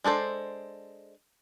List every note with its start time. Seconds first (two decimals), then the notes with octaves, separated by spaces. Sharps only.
0.04 G#3 D4 A4 C5